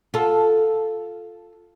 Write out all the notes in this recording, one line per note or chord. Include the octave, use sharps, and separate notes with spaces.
F4 A4